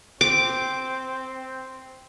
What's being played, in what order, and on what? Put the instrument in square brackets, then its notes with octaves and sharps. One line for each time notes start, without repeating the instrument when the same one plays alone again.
[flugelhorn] C4 [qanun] D6